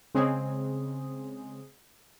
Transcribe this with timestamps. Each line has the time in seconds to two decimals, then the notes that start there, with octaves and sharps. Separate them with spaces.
0.14 C#3 G#3 C4 G#4